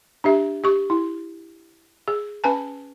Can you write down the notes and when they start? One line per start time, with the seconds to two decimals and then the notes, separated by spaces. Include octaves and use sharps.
0.24 D4 G4 E5
0.64 G4 C#6
0.90 E4
2.08 G#4
2.44 C#4 B4 G#5 A5